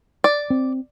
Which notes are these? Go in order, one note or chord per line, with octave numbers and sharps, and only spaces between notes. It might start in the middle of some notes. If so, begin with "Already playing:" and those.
D5
C4